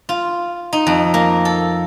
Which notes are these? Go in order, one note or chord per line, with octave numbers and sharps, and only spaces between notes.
F4
D#4
F2
A#3
A4